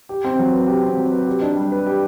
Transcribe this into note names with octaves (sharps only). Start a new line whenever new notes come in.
G4
C4
F#3
B4
G4
C4
F#3
B4
G4
D4
G3
B4
G4